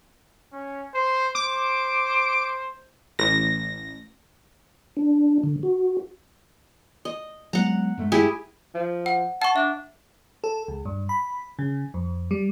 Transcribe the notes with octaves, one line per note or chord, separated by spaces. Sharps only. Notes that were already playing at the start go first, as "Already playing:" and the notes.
C#4
C5
C5 D6
A1 A#6
D4
D3
F#4
D#5
F#3 G#3 B3 F#5 A#5
G2 G#3 A3
E4 G4 G#4
F3
F#5
F#5 A5 C#6
D4 E5
A4
C#2
G2
B5
C#3
F2
G3